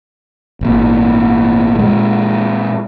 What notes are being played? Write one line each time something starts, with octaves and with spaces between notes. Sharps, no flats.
G#1 A#2
A#2 G#3